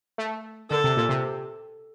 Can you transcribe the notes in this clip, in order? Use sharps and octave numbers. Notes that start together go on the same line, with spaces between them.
A3
D3 A4
C3
A#2
C3